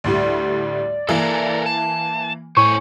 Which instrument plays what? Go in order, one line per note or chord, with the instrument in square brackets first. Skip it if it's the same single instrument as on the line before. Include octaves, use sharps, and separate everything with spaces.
[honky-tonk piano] D2 A2 G3 [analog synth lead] D5
[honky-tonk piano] E3 A#3 [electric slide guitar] A4 A#4
[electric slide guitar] A5
[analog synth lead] A2 [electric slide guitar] C5 C#5 G#5 [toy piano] C#6